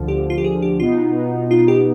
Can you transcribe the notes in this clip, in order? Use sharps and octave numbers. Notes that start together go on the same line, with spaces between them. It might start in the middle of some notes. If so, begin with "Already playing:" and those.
Already playing: D2 D3 F3
G4
F4
G4
G#4
G4
B2 B3 D#4 F4
F4
G4